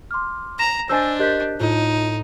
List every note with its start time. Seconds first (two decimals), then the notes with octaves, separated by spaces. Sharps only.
0.11 C6 D6 F6
0.59 A#5 A#6 E7
0.89 D4 C5 D#5 G#5 A5 E6 A6
1.19 G4 A#4 D#5 F#6 G6 B6
1.60 A2 D#4 F4